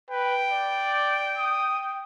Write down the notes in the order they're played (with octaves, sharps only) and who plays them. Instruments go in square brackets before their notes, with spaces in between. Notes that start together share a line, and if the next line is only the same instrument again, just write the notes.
[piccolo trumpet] B4 [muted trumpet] G5
[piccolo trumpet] D5
D#6